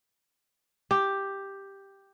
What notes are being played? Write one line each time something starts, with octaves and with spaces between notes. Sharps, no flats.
G4